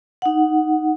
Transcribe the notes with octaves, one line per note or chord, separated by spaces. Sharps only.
D#4 F#5